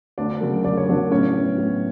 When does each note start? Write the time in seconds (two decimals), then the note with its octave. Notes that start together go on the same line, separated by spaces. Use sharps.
0.18 D2 D4 D5
0.41 C#3 F#3 A#3
0.64 D2 D5
0.77 C#5
0.88 C#3 F#3 A#3 D4 D5
1.11 A2 C#4 C#5
1.35 F#3 B3
1.58 A2